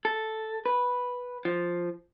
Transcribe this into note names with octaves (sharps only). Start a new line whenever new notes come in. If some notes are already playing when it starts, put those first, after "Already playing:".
A4
B4
F3